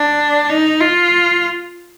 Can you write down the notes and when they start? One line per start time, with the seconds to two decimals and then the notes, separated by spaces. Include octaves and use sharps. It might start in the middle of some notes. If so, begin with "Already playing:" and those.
Already playing: D4
0.50 D#4
0.81 F4